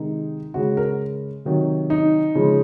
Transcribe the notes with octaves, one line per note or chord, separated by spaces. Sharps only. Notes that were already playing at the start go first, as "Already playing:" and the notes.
Already playing: C3 D#3 G#3 D#4
C#3 G#3 F#4
A#4
C3 D#3 F#3
D#4
C#3 F3 G#3